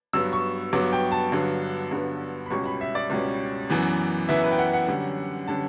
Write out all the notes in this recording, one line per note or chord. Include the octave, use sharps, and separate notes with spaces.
G2 F#3 B3 E6
C#6
G2 F#3 B3 D6
G5
A5
G2 D3 F#3 B3
G2 D3 F#3 B3
B5
C#2 B2 G3 C#4 C#6
B5
E5
D5
C#2 B2 G3 C#4
F#2 E3 B3
F#2 E3 B3 E5
B4
G5
F#5
F#5
F#2 D3 G3 C#4
D3 G3 C#4 A5